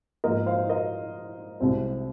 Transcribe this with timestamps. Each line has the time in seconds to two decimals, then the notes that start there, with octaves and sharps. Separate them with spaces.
0.24 G#2 F3 A#3 A#4 D#5
0.46 C5 F5
0.69 A#4 D#5
1.60 C2 C3 G#3 C4